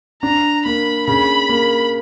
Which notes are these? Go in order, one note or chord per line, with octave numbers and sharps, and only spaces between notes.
D4 A#5
A#3 B5
C#3 B5
A#3